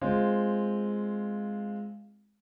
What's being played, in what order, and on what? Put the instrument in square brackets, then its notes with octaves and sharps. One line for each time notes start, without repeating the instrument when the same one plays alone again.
[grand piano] G#3 C4 F4